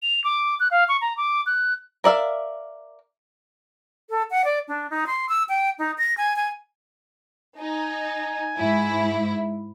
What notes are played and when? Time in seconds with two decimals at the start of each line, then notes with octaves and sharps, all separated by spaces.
0.02 F7
0.24 D6
0.60 F#6
0.71 F5
0.88 C#6
1.01 A#5
1.17 D6
1.46 F#6
2.04 A#4 D5 E5 F5
4.10 A4
4.31 F#5
4.45 D5
4.68 D4
4.90 D#4
5.07 C6
5.29 E6
5.49 G5
5.79 D#4
5.98 A#6
6.18 G#5
6.36 G#5
7.58 D#4 G#5
8.58 G#2 E4